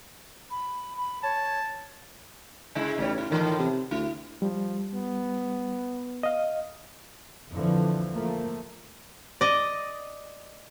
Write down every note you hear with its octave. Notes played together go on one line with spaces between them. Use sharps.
B5
B5
C#5 A5
C#3 G#3 E4
A1 G2 G3 C#5
A2 E4
A2 D#3 E3
C3
D2 E4
F3 G3
B3
D#5 F5
F2 D3 E3 F3
F3 A3 A#3
D5 D#5